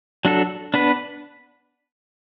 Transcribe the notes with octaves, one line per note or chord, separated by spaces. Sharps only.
F#3 D4 F#4 A4
B3 D4 B4